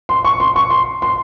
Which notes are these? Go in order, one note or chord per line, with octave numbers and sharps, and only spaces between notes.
C6
C#6
C6
C#6
C6
C6